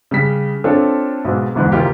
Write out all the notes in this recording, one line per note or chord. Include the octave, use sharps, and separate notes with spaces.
C#3 G3 B6
C4 D4 F4 A4 C#5
B1 G#2 B2
G1 E2 G#2 E3
F#1 D#2 D#4 F4 G4